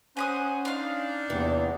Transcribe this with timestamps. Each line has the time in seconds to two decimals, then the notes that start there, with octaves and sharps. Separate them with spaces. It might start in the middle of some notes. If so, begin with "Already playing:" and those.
0.17 C#4 C5 F#5 G#5 B5 D#6
0.65 D4 D#4 F5 C6
1.30 E2 C3 E3 A#3